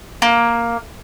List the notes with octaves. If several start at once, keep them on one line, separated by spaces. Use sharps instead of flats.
A#3